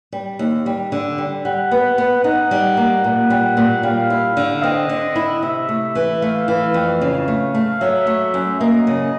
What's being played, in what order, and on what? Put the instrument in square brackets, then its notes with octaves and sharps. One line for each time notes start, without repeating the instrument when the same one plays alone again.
[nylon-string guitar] G3
D#2
G3
D3
G3
[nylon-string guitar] G3 [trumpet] F#5
[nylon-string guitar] B3
B3
[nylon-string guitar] D#4 [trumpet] F#5
[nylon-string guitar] G3
A#3
A#2
G3
A#2
[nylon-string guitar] G3 [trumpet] F5
[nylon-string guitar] E4
D3
[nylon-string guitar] C4 [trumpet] D#5
[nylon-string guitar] D3
E4
[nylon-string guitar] C3 [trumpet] E5
[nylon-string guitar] A3
E3
[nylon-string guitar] A3 [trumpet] F5
[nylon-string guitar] E3
F2
C#3
A3
A3
[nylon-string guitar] F#3 [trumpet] E5
[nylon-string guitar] A3
F#2
[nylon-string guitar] A#3 [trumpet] D#5
[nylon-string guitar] C#3